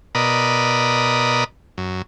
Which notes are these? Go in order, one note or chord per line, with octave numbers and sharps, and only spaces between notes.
B2 A#4 D5 D#5 B5
F#2